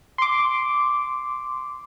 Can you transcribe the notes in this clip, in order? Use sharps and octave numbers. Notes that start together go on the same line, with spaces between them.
C6 D6